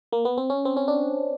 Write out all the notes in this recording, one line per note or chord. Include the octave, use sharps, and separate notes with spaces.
A#3
B3
C4
C#4
C4
C#4
D4